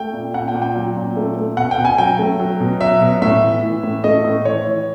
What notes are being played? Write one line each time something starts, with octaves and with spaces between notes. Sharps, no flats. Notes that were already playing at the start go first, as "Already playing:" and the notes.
Already playing: A3 G5
A#2
A#2 F#5
G5
A#2
G5
F#3
A#2
A3
A3
B2 F#5
G5
B2
G#5
F#3 G5
A3
F#3
B2
F#3 E5
B2
A2 E5
E3
E3
A2
A3 D#5
A2
E3 C#5
E3